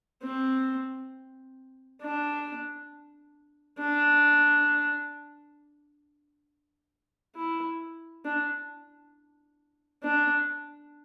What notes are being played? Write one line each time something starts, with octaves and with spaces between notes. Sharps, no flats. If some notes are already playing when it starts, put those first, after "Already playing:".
C4
D4
D4
E4
D4
D4